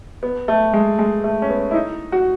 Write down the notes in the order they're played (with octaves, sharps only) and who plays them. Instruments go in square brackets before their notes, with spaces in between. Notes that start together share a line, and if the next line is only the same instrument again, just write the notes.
[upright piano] B3
A3
G#3
G#3
A3
C#4
B3
E4
D#4
F#4